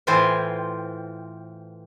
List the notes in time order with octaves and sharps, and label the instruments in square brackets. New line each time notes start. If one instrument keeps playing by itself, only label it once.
[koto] A2 E3 C4 F4 C5 G#5